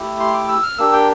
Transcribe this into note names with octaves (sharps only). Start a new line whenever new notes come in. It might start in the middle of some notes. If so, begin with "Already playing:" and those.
Already playing: A3 E4 G4
C6
D6
E6
F6
A#3 D4 G4 E6
G5